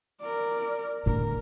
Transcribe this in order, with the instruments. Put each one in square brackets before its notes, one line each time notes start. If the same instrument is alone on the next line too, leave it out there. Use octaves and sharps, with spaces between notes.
[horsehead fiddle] A#4 D5
[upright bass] A2 D3 [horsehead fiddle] A#4